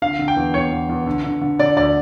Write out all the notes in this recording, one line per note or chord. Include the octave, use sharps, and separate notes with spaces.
D3 F5
D3
G5
E2
E2 C#5
E2
E2
D3
D3
D3
D3 D5
D2 D5